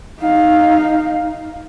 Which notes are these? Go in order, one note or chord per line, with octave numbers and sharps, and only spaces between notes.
D#4 F5